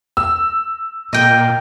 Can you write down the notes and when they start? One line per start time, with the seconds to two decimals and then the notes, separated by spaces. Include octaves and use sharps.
0.17 E6
1.13 A#2 D#5 G5